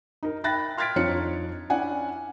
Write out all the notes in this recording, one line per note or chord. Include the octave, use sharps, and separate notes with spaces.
D#4 A#4
E5 G5 B5 F#6 A6 A#6
C6 F6 G#6 A6 B6 D7
F2 D4 D#4 F4 C#5 C#7
C#4 D4 E4 D5 F#5 G#5